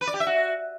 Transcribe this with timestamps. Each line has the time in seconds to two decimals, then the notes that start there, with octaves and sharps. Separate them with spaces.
0.01 B4
0.07 D5
0.14 G4
0.20 E5
0.27 F#4